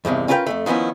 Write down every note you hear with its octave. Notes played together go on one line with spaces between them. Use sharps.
E2 G2 C3 D#3
C#4 F4 A#4 B4 D#5 G5
F2 G#2 A3
D#3 F3 B3 C#4 E4